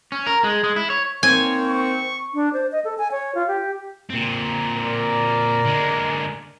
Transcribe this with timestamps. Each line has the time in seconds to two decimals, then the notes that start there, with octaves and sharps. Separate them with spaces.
0.12 C#4
0.27 A#4
0.44 G#3
0.64 G#3
0.76 E4
0.90 C#5
1.23 D#3 A#3 C4 C#5 G#5
1.68 C#6
2.33 D4
2.53 C5
2.72 D#5
2.85 A4
2.98 G#5
3.12 C#5
3.35 F4
3.48 G4
4.10 A#2 C4
4.76 A#4 D5
5.65 D3 G#3